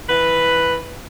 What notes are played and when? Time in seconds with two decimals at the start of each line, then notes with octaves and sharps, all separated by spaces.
0.08 E3 B4